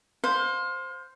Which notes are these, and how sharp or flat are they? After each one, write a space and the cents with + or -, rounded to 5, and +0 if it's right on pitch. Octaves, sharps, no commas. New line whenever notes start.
C5 +0 F5 +30